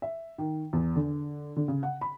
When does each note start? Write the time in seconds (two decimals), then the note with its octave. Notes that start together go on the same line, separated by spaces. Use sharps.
0.02 E5
0.38 D#3
0.73 E2
0.96 D3
1.56 D3
1.68 C#3
1.83 F#5
2.01 B5